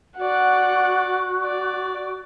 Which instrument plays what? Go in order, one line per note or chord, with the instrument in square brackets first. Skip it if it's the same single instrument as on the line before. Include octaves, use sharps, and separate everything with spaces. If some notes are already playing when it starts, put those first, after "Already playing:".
[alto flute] F#4 [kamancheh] D5 F#5
[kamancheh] D5